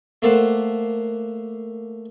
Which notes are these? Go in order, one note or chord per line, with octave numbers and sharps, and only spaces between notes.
A3 A#3 A4 C5 F#5